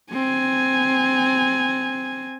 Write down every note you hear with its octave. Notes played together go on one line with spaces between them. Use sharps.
C4 G#5